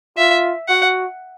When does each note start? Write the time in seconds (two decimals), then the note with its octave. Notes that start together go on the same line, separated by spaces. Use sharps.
0.18 F4 E5
0.68 F#4 F#5